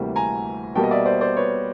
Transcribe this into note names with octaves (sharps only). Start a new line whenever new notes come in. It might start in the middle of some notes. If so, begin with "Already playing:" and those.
Already playing: D2 C3 E3 G3 A#3
G#5 A#5
B2 G3 A#3 G5 A5
D#5
D5 E5
C5 D5
C5 D5
B4 C#5